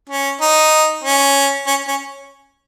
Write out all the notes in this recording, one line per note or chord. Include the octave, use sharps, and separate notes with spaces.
C#4
D#4
C#4
C#4
C#4